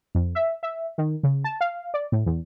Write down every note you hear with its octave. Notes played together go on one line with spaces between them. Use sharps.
F2
E5
E5
D#3
C#3
A5
F5
D5
A2
E2